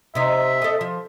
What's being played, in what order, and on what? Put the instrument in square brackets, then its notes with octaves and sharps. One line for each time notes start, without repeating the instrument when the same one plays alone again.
[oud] C3 D#4 [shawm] E5
[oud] A4 D#5
F3